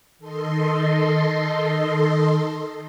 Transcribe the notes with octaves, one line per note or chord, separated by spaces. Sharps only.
D#3 A4 D#5 C6